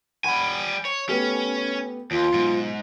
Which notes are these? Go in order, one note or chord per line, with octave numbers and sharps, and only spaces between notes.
G3 F#5 G#5 B5
C#5
A3 B3 C#4 G4
D#2 F4
B1 G#2